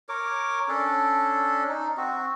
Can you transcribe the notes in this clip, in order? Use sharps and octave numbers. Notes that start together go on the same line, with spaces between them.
A#4 C#5 D6
C#4 D4 A4
D#4
C4 F#4